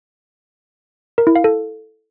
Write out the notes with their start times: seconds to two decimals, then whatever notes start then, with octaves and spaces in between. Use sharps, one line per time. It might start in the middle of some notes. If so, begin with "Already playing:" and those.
1.18 A#4
1.27 E4
1.36 F5
1.44 A4